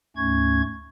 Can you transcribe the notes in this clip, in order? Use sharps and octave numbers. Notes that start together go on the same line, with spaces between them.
D2 G#2 A3 C#4 C#6 G#6